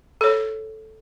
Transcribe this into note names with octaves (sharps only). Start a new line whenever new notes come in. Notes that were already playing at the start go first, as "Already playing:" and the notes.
A4 C#5